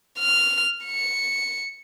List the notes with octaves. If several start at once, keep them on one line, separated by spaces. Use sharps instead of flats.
F6
C#7